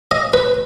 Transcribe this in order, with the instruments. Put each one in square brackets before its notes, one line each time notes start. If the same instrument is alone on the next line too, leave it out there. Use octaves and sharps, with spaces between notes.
[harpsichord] D#5
B4